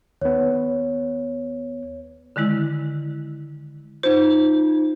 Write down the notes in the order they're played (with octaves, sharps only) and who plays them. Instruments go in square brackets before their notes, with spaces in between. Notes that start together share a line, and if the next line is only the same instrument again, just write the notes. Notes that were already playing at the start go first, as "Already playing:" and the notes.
[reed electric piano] D#2 B3 [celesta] C#5
[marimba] D3 D#3 G#3 E4
[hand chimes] D#4 F4 [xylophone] C5